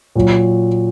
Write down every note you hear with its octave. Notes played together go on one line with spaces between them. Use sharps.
A#2 F#3